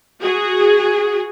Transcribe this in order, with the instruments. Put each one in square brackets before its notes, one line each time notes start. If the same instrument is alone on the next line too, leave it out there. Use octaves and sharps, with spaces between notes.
[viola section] F#4 G#4